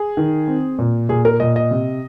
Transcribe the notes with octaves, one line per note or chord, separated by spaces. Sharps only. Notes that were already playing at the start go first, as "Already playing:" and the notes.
Already playing: G#4
D#3
C4
A#2
A#2 G#4
A#4
A#2 D#5
D#5
C3